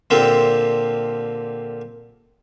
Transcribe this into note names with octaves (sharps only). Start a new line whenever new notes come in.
A#2 D3 A#3 C4 G4 A4